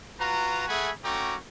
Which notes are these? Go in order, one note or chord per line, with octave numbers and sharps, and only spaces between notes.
F4 F#4 B4 A#5
A3 G#4 E5 F#5 G#5 B5
A3 C#4 F#4 G5 A#5 D6